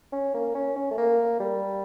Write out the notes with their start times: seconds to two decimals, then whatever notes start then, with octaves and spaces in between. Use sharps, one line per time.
0.12 C#4
0.34 A#3
0.55 C#4
0.76 C#4
0.91 A3
0.98 A#3
1.40 G3